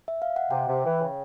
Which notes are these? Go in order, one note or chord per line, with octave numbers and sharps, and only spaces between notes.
E5
F5
F#5
C3 G5
C3
E3
C#3